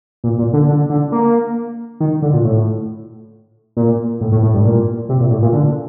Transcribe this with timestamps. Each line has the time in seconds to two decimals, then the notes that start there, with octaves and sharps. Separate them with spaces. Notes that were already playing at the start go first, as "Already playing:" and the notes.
0.24 A#2
0.39 A#2
0.53 D3
0.68 D3
0.90 D3
1.12 A#3
2.00 D#3
2.22 D3
2.34 A#2
2.44 A2
3.77 A#2
4.21 A2
4.32 A2
4.43 A2
4.54 G2
4.65 A#2
5.09 C3
5.20 A#2
5.31 A2
5.42 A#2
5.53 D3